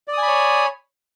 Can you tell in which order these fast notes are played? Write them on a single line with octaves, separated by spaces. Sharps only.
D5 D#6 G#5 B5 C#5